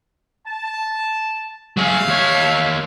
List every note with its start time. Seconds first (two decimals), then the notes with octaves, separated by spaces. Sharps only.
0.46 A5
1.77 F#3 A3 G#4 E5 F5
2.07 D#2 C#5